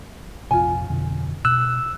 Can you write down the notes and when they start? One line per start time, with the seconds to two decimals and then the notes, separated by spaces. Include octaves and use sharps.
0.51 A#1 F2 C3 F4 G#5
0.90 F2 B2 D3
1.45 B2 E6 F#6